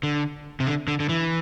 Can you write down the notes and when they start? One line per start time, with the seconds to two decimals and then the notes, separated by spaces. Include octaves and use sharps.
0.03 D3
0.60 C3
0.67 D3
0.88 D3
1.00 D3
1.09 E3